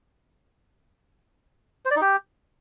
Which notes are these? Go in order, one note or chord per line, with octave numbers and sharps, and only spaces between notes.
C5
D5
D#4
G4